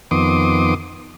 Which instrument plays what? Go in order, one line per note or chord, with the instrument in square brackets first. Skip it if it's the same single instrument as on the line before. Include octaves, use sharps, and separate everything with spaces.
[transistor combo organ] F2 D#3 B3 C6 D6 D#6